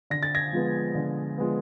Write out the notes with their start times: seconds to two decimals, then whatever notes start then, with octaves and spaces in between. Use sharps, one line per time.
0.10 D3 A#6
0.23 A6
0.35 G#6 A#6
0.53 F3 G#3 B3
0.95 D3
1.38 F3 G#3 B3